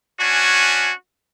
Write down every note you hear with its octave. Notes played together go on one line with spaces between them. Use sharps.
C#4 D4 F#4 G#5